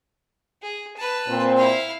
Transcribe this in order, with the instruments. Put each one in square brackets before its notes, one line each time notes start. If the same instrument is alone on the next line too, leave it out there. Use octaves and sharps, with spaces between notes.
[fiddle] G#4
B4 A5
[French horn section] A#2 C4
[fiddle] E4 F5